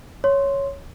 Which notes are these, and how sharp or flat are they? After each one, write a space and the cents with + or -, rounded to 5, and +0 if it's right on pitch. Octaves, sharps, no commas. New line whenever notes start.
C#5 +0 C6 +0